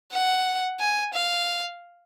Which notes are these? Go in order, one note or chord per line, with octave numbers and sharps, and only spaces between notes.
F#5
G#5
F5